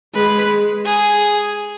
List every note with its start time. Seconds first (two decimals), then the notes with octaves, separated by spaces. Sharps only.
0.15 G#3 B4
0.86 G#4